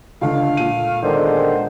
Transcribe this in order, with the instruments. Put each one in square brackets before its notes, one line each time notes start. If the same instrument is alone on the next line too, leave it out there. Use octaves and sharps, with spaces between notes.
[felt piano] C#2 D3 [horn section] A3 F5
[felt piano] A#2 D#7
[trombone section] D3 D#3 G#3 [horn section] B3 D4 C5